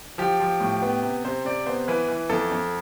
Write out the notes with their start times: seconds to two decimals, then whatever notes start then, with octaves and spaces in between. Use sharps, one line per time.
0.18 F3 G4
0.40 F3
0.61 A2
0.82 B3
1.03 C3
1.25 C3 C5
1.45 C3 D5
1.66 B3 C5
1.88 E3 B4
2.08 E3
2.29 F2 A4
2.52 F2